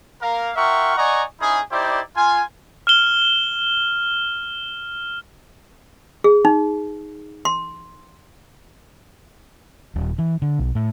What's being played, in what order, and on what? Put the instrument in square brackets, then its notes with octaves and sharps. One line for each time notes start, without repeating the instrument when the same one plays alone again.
[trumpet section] A#3 A#4 F5
F4 A#4 E5 F#5 G5 C#6
D5 D#5 F#5 G#5 A#5 C#6
C#4 D#4 E4 G#4
D#4 E4 G4 C5 D5
F4 G#5
[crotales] F6 E7 G7
[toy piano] G#4
D#4
C6
[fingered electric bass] D#1
E3
D3
B1
A2